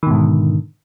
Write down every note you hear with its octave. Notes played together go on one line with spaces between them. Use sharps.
G#2 B2 D3 D#3